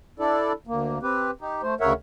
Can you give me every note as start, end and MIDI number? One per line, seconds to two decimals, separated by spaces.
0.19 0.52 62
0.19 0.52 64
0.19 0.52 69
0.19 0.52 74
0.67 0.99 38
0.67 0.99 58
1.03 1.31 60
1.03 1.31 67
1.03 1.31 71
1.41 1.62 63
1.41 1.62 67
1.63 1.74 57
1.63 1.74 72
1.80 1.93 38
1.80 1.93 49
1.80 1.93 70
1.80 1.93 73
1.80 1.93 76
1.80 1.93 78